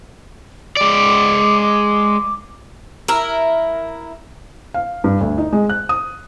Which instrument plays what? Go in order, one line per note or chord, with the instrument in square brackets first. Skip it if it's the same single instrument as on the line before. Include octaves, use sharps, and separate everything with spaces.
[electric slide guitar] G#3 D5 [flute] D6
[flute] D6
[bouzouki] E4 A#4
[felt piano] F5
G2
D2
D#4
G#3
F#6
D#6